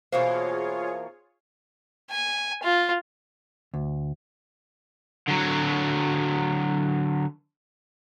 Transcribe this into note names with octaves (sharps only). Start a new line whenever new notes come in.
B2 E3 A#3 F4 G#4 C5 C#5
G#5
F4
D2
D3 F#3